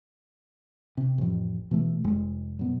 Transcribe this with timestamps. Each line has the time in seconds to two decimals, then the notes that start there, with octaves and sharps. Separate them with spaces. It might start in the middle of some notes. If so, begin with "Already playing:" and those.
0.97 C3
1.18 A1 F2
1.71 B2 E3 A3
2.04 F1 F2 G#3
2.59 F#2 B2